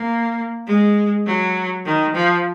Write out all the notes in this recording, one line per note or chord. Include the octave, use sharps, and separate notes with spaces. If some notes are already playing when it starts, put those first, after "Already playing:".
Already playing: A#3
G#3
F#3
D#3
F3